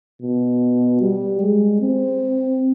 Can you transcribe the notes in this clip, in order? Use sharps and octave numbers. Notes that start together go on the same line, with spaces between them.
B2
G3
G#3
C4